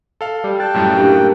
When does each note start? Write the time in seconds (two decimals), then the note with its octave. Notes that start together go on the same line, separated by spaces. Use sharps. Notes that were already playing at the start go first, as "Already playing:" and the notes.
0.21 A4 F5
0.44 G3
0.60 G5 A5 F#6
0.74 F#2 A2 G3
0.97 A#3 D4 G4 A#4